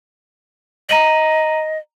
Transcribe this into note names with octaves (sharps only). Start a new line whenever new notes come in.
D#5 A#5 D#7 F#7